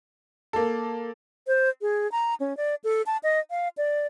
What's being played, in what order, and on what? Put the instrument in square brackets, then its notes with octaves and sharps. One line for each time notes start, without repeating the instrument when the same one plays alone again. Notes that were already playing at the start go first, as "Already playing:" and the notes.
[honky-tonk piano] A#3 A4
[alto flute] C5
G#4
A#5
C#4
D5
A4
A5
D#5
F5
D5